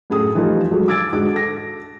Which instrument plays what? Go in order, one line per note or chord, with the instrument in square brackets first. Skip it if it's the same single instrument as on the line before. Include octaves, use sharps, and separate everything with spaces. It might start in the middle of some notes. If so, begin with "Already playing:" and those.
[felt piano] F#2 A2 G#4 A4 D#6
E3 F3 G3 A3 D#4 F4
F#3 G#3 A4
D6 E6 G#6 A6 D7
G#2 D3 F#4 G#4 D6
A4 A#6